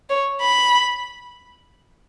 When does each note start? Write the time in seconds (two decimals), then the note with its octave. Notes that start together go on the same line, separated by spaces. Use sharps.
0.09 C#5
0.41 B5